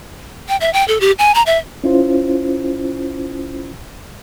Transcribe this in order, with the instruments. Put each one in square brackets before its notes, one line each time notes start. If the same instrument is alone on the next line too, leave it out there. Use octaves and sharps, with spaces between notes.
[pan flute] G5
E5
G5
A4
G4
G#5
A#5
E5
[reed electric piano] C#4 E4 F4 C5